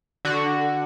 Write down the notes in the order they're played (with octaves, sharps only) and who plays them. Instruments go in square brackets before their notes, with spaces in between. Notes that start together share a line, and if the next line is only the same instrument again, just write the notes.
[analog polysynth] D3 F#4